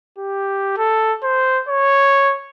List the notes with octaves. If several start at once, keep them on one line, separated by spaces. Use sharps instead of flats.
G4
A4
C5
C#5